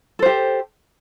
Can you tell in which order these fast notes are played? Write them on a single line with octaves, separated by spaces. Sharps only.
A4 C5 G4